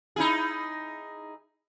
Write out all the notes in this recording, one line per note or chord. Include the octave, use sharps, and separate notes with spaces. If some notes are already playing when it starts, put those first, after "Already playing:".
D#4 E4 G#4